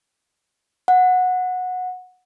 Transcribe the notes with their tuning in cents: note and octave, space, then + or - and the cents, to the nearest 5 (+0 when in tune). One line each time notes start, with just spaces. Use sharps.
F#5 -15